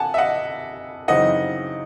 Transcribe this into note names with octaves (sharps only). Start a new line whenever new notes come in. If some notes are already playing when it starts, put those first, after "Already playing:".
Already playing: C3 F#5 G#5 A5
E5
D#5 F#5
F#2 C#3 E3 C4 D#4 D#5 F#5